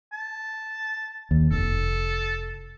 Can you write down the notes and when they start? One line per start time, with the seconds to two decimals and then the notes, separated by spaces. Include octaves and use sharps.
0.12 A5
1.31 D#2
1.51 F1 A4